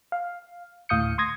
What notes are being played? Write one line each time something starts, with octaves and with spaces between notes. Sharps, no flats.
F5
D2 A2 F5 D#6 G6 C#7
C6 D#6 G#6 A#6